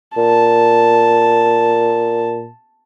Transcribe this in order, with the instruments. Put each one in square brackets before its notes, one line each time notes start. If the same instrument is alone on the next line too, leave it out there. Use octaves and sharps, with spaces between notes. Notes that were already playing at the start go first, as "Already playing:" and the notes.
[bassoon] A#2 [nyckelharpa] A5